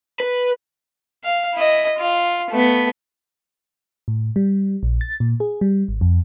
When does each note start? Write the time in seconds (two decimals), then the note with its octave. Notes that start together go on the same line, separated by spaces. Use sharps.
0.20 B4
1.24 F5
1.55 E4 D#5
1.99 F4
2.51 A3 B3
4.08 A2
4.36 G3
4.83 A#1
5.01 A6
5.20 A#2
5.40 G#4
5.61 G3
5.88 G#1
6.01 F2